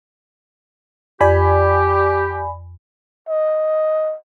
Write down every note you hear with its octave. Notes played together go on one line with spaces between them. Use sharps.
F2 G4 D5 G#5 B5
D#5